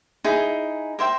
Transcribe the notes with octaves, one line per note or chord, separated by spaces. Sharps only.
D#4 E4 G#4
A#4 C5 E5 G5